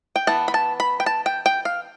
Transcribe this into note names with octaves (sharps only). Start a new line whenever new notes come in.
G5
E3 B3 A5
B5
A5
B5
G5
A5
G5
G5
F5